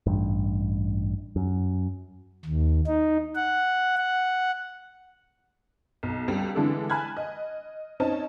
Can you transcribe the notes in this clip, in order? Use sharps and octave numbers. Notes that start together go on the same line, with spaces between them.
A1 G2
F#2
D#2
D#4
F#5
F#5
B1
C#2 G3 A4
D3 E3 G#3 D4 E4 A4
G#5 A5 B5 F#6 G#6
D#5
C4 C#4 D#4 D#5 A5